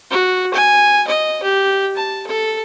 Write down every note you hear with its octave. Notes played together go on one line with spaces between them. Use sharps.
F#4
G#5
D#5
G4
A5
A4